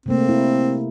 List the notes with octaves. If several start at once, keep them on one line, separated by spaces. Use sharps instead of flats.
C3 A3 A#3 C4
E4